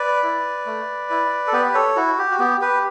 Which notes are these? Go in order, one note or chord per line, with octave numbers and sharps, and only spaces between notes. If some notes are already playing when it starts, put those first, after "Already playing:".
Already playing: B4 D5
E4
A3
E4
A4
B3 G4 B4
A4 C#5
E4 F#4
G4
F#4
B3 G4
G4 B4